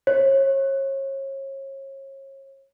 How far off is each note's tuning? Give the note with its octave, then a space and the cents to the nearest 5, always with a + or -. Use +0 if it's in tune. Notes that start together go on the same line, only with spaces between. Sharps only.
C#5 -35